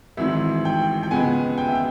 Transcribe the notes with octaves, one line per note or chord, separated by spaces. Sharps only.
G#1 G#2 E3 E5
G5
G5
C#2 C#3 G#3 B3 G#5
G5
E5
G5